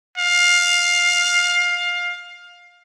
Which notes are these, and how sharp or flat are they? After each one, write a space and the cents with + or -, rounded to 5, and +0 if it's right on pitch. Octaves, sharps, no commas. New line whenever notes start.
F5 +15